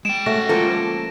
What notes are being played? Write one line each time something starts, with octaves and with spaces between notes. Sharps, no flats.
G#3 G5 D7 E7
A3 C#4 F#4 A#6
F3 A#3 A4